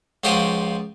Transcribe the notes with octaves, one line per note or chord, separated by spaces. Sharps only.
C#2 F3 F#4 G4 F5 G#5